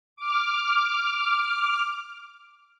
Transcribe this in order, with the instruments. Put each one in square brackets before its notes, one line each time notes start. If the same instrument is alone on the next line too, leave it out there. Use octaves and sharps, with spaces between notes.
[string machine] D6 F6